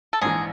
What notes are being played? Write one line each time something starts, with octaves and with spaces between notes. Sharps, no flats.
A4
A#1 G#2 E3 G#4